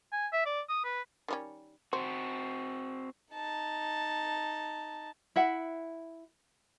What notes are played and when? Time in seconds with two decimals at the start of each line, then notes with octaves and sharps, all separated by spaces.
0.12 G#5
0.32 E5
0.46 D5
0.69 D#6
0.84 B4
1.28 D#3 G3 C#4
1.93 C4 F#4 C5
3.33 D#4 A5
5.36 E4 E5 F#5